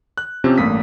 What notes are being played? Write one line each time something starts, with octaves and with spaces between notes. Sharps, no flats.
F#6
C3 F3 C4 C#4 G4 C5
A1 G2 A3 A#3 D#6 B6